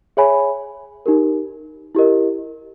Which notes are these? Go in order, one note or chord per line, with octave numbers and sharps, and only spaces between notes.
G#4 C#5 E5 G#5 B5
D#4 G4 A#4
E4 G4 A#4 D#5